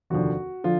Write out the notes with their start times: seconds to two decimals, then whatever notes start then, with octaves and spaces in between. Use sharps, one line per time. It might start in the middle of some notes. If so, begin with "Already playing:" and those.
0.10 F1 D#2 D3 F3 F#4
0.64 D3 F3 F4